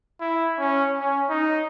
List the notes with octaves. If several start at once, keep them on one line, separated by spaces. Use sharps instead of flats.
E4
C#4
C#4
D#4